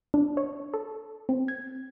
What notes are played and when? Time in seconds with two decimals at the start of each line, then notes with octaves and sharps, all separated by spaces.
0.14 D4
0.37 C#5
0.74 A4
1.29 C4
1.48 G#6